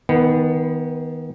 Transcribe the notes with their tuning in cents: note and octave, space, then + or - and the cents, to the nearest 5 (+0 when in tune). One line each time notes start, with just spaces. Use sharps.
D#3 +25 B3 +0